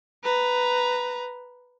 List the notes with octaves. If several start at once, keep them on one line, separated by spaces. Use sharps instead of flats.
B4 A#5